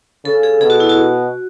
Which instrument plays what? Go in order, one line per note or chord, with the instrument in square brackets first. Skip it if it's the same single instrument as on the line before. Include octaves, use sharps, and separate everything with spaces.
[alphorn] C#3 [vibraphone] A4
[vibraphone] G#4
[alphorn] B2 [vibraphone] G#4
[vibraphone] F#4
E4
F#4